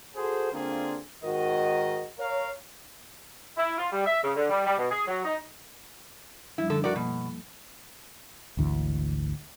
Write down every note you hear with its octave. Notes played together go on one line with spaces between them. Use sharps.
F#4 G#4 A4 C5
D3 A#3 C4 D4 F4 G#4
G#2 D#3 F#4 A#4 D#5
A#4 C#5 F5
E4
F4
G3
E5
C#3
D3
G3
G3
B2
G#4
F#3
D#4
F#2 F3 G3 E4
D3 A4
F#4 A#4 D5
B2 F3 A#3
G#1 D2 E3